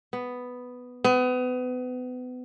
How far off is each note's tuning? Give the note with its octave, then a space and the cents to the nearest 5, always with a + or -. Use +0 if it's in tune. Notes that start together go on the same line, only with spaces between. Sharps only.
B3 +5
B3 +30